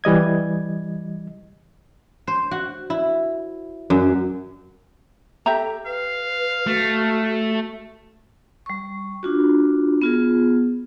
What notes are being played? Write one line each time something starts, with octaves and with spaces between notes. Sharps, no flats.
E3 G3 D#5 G#6
C5
F#4
E4
F#2
G4 A4 E5 A#5
B4 F5
A3 F#4
G3 C#6
D4 F4 F#4
B3 F4 G#4